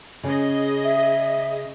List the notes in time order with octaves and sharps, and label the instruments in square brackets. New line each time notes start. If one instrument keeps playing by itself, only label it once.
[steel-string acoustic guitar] C#3 [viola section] G#4 D#5
[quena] E5